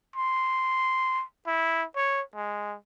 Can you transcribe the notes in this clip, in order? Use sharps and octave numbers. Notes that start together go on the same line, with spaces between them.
C6
E4
C#5
G#3